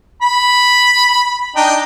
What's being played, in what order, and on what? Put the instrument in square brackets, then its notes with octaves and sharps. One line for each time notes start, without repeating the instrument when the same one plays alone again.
[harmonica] B5
D4 D#4 G5